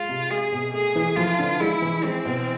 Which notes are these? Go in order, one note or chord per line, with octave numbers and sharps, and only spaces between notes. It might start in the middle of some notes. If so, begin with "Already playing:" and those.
Already playing: G#3 F4
C3
G#3 G#4
B2
A3 G#4
E3
F3 F4
D3
G#3 E4
E3
G#3 C4
B2